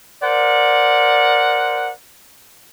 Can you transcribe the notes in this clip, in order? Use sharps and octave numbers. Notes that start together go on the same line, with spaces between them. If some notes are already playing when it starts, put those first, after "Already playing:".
A#4 C5 D5 F#5